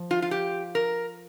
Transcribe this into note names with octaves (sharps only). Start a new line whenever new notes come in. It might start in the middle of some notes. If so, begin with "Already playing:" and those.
Already playing: F3
F4
F4
G4
A#4